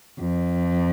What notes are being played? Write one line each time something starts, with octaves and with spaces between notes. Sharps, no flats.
F2